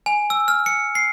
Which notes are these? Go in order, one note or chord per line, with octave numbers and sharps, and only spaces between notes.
G#5
E6
F6
C#7
C7